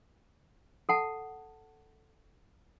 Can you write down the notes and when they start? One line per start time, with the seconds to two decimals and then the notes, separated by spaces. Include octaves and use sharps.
0.89 A4 F#5 A5